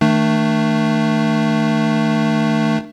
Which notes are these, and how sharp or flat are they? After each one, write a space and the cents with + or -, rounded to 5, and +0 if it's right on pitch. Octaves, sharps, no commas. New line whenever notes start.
D#3 +15 A3 +15 D4 +25